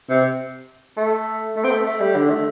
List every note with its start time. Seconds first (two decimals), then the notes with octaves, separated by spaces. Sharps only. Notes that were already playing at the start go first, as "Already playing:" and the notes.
0.10 C3
0.97 A3
1.56 A3
1.64 C4
1.71 A3
1.86 A3
2.00 G3
2.16 D3
2.30 A3